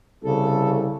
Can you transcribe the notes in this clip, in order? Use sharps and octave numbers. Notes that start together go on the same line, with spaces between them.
C2 C#3 A4